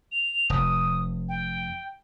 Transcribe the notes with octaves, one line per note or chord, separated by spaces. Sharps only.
F7
F1 D#6
G5